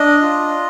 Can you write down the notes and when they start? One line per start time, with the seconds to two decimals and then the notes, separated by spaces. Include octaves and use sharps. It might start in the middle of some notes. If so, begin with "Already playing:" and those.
Already playing: D4 D#5
0.22 F4